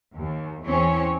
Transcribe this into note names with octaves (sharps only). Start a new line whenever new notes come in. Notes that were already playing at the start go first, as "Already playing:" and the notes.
D#2
E2 E3 C4 C#4 C#5